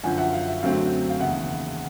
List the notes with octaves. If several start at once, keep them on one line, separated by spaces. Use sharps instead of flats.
F#2 D3 F3 F#5 G#5
E5 F#5
F5
E5
F#2 D3 F#3 A3 C4 F5
F5
E1 D#2 C#3 E5 F#5